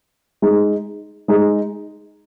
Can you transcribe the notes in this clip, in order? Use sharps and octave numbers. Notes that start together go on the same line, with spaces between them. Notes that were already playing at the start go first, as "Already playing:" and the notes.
G#3 D#4 G#4
G#3 D#4 G#4